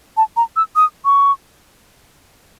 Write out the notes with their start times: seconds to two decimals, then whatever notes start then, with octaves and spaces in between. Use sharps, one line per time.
0.17 A5
0.37 A#5
0.56 E6
0.76 D#6
1.05 C#6